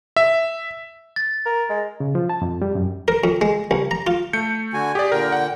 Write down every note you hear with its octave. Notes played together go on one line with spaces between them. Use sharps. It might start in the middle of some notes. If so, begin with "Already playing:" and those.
E5
A6
A#4
G#3
C#3
F3
A5
F2
G3
F#2
A#4
F2
G#3
C2
A#5
F4
A3 G6 C#7
D3 F#4 G#5
G4 G#4 D5
A#2 D3 A#4 G5
F#5